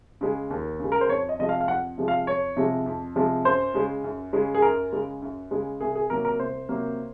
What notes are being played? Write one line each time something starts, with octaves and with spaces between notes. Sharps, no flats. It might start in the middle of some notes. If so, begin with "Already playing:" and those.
C#3 G#3
D#2
C#3 G#3
A#4
C5
F2 C#5
D#5
C3 F3 G#3 D#5
F5
F5
F2 F#5
C3 F3 G#3
F5
F2 C#5
C3 F3 G#3
F2
C3 F3 G#3
F#2 C5
C#3 G#3
F#2
C#3 G#3
G#4
F#2 A#4
C#3 G#3
F#2
C#3 G#3
C2 G#4
G#4
C3 F#3 A#3 A#4
A#4
C2 C5
C3 F#3 A#3